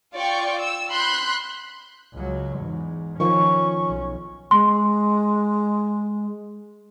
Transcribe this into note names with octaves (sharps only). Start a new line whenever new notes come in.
F4 D5 G5 C#6
E6
B5 C6 F#6 G6
C#2 F#3
E2 G#2
D#3 F3 C#4 C#6
B1
G#3 C6